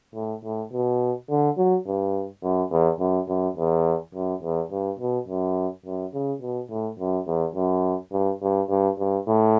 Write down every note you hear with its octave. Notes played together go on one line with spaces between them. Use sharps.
A2
A2
B2
D3
F#3
G2
F#2
E2
F#2
F#2
E2
F#2
E2
G2
B2
F#2
F#2
C#3
B2
A2
F#2
E2
F#2
G2
G2
G2
G2
A2